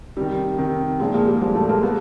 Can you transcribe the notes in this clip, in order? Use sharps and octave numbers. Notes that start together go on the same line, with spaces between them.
C3 D#3 G3
C3 D#3
A#2 F3 G#3
G#3 A#3
G3
A#2 F3 G#3
G3 A3
G#3 A#3
F3 A3 B3